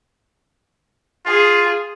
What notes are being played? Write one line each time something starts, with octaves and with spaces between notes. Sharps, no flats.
F4 G#4